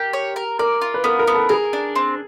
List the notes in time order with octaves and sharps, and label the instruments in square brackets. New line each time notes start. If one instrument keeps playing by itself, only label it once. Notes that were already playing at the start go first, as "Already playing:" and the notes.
Already playing: [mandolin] G4 [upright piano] A#4
[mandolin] C#5
A#4
[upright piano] A#4 [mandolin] D5
[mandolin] F4
[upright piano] B4
[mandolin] B3 [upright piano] A#4
[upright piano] A#4
[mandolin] B3
[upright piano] A4
[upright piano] G#4 [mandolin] A#4
[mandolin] D4
C4